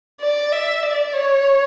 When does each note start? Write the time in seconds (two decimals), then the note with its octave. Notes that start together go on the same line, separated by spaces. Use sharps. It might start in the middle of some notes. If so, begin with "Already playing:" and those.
0.21 D5
0.53 E5
0.83 D5
1.13 C#5